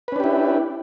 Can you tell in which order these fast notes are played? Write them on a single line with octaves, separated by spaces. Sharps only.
B4 C#4 D4 G4 E4